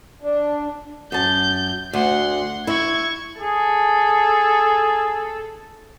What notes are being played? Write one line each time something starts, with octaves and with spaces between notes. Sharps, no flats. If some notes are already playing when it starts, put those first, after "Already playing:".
D4
F#2 A5 G6
D2 F#5 C6
E4 C#6 G#6
G#4 A4